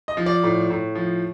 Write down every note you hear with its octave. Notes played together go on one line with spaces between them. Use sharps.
D#5
F3
D5
A2
A2
F3